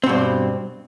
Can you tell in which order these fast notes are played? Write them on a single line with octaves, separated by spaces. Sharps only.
C4 B2 G2